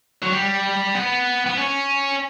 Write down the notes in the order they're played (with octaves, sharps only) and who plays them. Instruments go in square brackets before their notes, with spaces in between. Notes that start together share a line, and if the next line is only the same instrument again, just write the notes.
[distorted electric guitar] F#3
G3
B3
B3
C#4